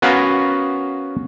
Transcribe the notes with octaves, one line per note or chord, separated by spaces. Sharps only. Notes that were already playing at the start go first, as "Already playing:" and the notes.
B3 C#4 F#4 A#4 B4 F5